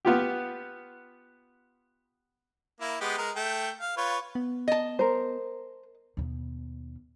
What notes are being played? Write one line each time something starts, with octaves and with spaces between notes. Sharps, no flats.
B3 F4 G4
A#3 E4
G#3 B3 G4
G#3 A#4
A3 G5
F5
F4 B4 C#5
B3
D#5 A5
A#4 C5
D#2 B2